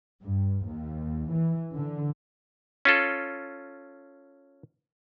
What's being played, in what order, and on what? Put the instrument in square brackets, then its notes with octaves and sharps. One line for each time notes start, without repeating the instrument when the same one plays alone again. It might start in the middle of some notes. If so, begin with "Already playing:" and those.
[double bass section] G2
D#2
E3
D3
[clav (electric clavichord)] C#4 F4 A4